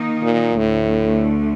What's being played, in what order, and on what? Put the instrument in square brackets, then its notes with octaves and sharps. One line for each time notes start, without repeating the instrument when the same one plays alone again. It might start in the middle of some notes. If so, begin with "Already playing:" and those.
Already playing: [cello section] D#3 A#3 D#4
[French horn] A#2
[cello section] D2 D3 A3 [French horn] A2